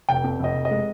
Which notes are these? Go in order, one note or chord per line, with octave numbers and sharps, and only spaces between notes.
F1 G5
F2
F1 D#5
F1
D#5
G#3